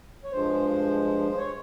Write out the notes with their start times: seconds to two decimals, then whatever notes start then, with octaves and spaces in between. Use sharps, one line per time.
0.24 C#5
0.32 G2 F3 G#3 C5
1.37 C#5